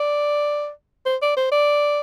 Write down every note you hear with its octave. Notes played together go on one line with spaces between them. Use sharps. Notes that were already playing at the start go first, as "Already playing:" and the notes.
Already playing: D5
C5
D5
C5
D5